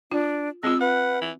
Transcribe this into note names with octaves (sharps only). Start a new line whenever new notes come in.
D4 F4
G#3 C4 F4 E6
B4 F#5
E3